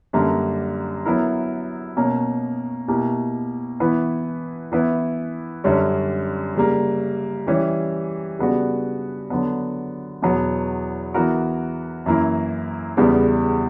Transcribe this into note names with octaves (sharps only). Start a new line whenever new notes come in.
F#2 D3 G3 A#3
F#3 B3 E4 A#4
B2 A#3 C#4
B2 A#3 E4 G4
E3 B3 E4 B4
E3 B3 E4 B4
F#2 D3 G3 C#4
C#3 G3 A#3
E3 G3 C#4 G4
C#3 G3 B3 D4 F#4
D3 F#3 B3
E2 B2 F#3 B3 F#4
E3 B3 F#4 A#4
F#2 E3 A#3 E4
E2 C#3 G3 B3